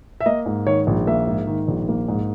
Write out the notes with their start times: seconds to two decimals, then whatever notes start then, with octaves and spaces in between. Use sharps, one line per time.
0.21 E5
0.26 A#3 D#5
0.46 G#2
0.67 D#3 C#5
0.87 A#1
1.07 A#3 E5
1.27 G#2
1.47 D#3
1.68 A#1
1.89 A#3
2.08 G#2